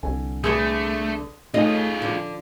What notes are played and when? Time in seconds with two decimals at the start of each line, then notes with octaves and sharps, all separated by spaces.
0.03 C2 D3 G#5
0.44 D3 A3 B3 G#4 C6 D#6
1.54 A3 D#4 F4 G#4 A4 D#5
2.02 D3 F3 D4